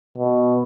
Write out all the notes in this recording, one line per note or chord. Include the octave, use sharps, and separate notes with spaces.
B2